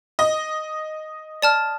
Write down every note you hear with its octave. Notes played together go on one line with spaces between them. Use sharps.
D#5
D5 A5 F6